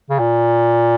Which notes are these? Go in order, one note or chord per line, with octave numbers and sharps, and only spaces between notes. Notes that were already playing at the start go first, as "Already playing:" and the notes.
C#3
A#2